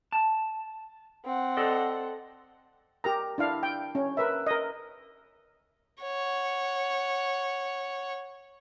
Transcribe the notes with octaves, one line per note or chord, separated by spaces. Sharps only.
A5
C4 F#5
A4 D5 D#5
G4 A#4 A#5
D4 E4 F5
G5
C#4
A#4 B4 E5
A#4 D#5
C#5 F#5